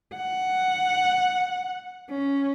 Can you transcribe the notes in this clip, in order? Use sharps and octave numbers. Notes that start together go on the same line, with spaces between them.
F#5
C#4